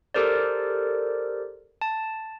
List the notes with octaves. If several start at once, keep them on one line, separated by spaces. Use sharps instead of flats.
G4 A4 A#4 C5 D5
A5